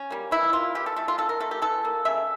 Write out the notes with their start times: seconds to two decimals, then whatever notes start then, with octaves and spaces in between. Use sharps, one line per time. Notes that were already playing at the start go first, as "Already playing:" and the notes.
Already playing: C#4
0.10 G3 A#3
0.31 E3 E4
0.53 A#3 F4
0.75 E3 G4
0.86 A4
0.96 A3 A4
1.08 F4
1.18 D3 A4
1.29 A#4
1.40 A3 A4
1.51 G4
1.62 E3 A4
1.85 A#3
2.05 C#3 E5